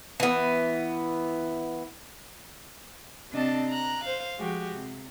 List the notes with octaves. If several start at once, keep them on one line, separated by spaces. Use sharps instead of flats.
E3 B3
C3 C4 D4 D#5 A5
A#5 F#6
C5 F5
F3 G#3 F#4 G4
C3